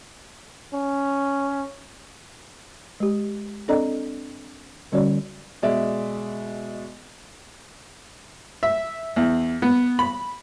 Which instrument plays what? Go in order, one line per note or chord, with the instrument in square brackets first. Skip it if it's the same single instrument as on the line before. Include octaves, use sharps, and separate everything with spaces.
[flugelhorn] C#4
[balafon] G#3 G4
C4 D4 A4 D5 D#5 A#5
D3 G3 C#4 F#4 C#5 D5
[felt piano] B2 G#3 D5 E5
[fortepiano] E5
E2
B3
B5